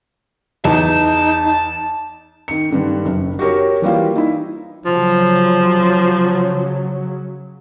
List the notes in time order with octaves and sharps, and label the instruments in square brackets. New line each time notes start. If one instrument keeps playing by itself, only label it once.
[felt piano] E2 [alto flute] D#4 [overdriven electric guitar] A5
[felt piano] D#3 C#7
G2 D3 D#3
F#1
F#4 G4 A#4 C#5
E3 G3 A#3 F4
D#4 E4
[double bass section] C#3 F#3 [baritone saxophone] F3